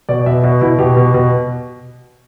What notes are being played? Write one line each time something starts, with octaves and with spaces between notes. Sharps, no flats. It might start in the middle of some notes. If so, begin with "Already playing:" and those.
B2 D5
B2 E5
B2
B2 E4
B2 G4
B2
B2